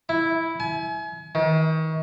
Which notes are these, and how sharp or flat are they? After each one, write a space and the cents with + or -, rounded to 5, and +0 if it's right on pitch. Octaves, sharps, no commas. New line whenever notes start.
E4 -5
G#5 +35
D#3 +35